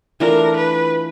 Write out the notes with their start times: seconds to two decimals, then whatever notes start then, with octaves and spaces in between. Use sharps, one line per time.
0.20 E3 A3 D4 F4 A#4
0.57 B4